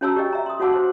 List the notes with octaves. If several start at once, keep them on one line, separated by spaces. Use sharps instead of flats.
C#4 F#4 C#5 A5 A#5 E6
G4 D5 D#5 G5
E5 A#5
C6 D#6
F#4 C#5 F#5 A5 D6 E6
F#4 C5 C6